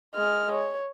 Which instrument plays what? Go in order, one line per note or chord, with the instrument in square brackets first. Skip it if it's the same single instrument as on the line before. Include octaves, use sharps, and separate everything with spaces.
[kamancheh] G#3 F6
C#5